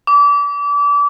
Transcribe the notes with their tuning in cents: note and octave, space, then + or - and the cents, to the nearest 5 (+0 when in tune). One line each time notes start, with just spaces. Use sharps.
D6 -30